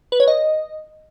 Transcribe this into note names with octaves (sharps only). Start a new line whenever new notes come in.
B4
C#5
D#5